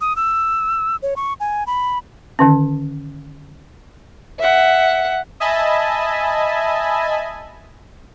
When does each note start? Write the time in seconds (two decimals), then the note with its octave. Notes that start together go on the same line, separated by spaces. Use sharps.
0.01 D#6
0.16 E6
1.02 C#5
1.16 C#6
1.40 G#5
1.67 B5
2.39 D3 D#3 C#4
4.40 E5 F#5
5.40 D#5 E5 G#5 A5 B5